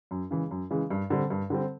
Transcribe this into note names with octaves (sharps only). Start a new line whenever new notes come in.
F#2
C#3 E3 G#3
F#2
C#3 E3 G#3
G2
D3 G3 C4
G2
D3 G3 C4